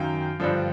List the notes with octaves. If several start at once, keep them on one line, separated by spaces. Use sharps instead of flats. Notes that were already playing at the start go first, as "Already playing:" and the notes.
Already playing: F#2 D#3 F5 G5
G2 D3 F3